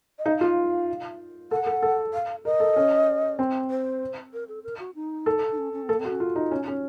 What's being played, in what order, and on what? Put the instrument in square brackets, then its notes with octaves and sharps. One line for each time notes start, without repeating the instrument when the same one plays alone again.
[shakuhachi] D#5
[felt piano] D#4 [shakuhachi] F5
[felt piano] F4
[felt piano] A4 [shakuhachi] F#5
[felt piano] A4
A4
[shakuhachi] F5
[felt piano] A#4 [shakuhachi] D#5
[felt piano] A4
C#4
C4
[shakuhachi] C5
A#4
A4
A#4
F#4
D#4
[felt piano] A4
[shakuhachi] D#4
C#4
C#4
C4
[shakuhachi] A#3 [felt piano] A4
[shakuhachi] C4
[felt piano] F#4
[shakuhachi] C#4
[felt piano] F4
D#4
C#4
C#4